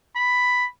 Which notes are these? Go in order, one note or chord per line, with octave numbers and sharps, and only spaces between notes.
B5